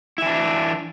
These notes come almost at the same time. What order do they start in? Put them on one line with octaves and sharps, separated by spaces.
E4 E3 D4